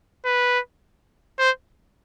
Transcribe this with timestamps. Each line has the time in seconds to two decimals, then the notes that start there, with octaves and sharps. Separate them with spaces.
0.25 B4
1.39 C5